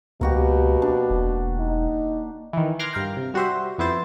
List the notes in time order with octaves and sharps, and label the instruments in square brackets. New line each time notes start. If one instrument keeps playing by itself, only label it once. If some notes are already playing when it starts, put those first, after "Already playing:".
[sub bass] C#2 [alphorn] B2 [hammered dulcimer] A#3 F#4 G4
[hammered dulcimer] D4
[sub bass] E1
[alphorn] D#4
[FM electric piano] D#3 E3
C6 D6 F6 F#6 G#6 A#6
G2 A#4 F5 G5 A#5
C3
G3 F#4 G4 C5 E5
F2 B3 E4 C5 A6